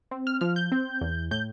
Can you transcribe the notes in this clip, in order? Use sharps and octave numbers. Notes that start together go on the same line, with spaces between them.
C4
F6
F3 F6
G6
C4
E2
A2 G6